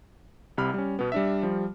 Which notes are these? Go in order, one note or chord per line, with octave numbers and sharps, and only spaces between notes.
C2 C3 B5 F6
G3 C#4
B2 B3
G3 D4 E5
F3 G3